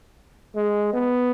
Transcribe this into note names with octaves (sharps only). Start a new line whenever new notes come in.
G#3
B3